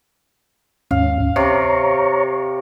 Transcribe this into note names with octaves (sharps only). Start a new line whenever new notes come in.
D#2 G#2 C#4 F5
D2
C3 C#5 A#5 C#6